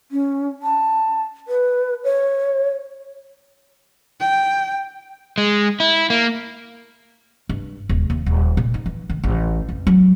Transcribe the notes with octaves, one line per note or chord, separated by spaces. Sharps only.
C#4
A5
B4
C#5
G5
G#3
E4
A#3
G2
D#1
D#2
D#1
A#2
D#4
E3
D#3
A1
F2
F#3